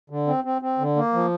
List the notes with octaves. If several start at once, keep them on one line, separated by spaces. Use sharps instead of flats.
D3
C4
C4
C4
D3
A#3
F3